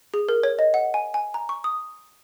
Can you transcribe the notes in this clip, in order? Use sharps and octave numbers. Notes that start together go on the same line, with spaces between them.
G#4
A#4
C#5
D#5
F#5
G#5
G#5
A#5
C#6
D#6